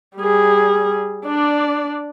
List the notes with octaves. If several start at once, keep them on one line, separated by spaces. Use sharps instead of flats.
G3 G#4
D4 D5